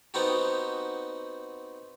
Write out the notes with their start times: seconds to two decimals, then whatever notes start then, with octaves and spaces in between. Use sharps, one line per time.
0.14 B3 C4 D#4 F#4 G4